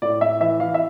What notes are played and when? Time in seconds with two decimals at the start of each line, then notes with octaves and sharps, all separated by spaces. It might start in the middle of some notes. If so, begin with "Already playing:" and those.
0.02 A2 D5
0.21 A2 E5
0.40 E3 E5
0.60 E3 F5
0.74 E5